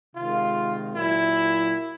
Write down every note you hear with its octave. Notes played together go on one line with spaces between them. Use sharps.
C3 D#3 G#3 F4
A#2 F#3 E4